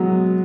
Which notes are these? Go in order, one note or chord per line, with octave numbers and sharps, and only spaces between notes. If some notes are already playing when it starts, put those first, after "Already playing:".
Already playing: F#3 G#3 B3